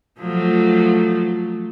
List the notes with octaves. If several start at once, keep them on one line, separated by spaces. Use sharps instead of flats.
F3 F#3 A3